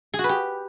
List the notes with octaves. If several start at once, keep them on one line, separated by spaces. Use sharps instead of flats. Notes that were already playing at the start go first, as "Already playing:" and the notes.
G#4
F#4
B4
G4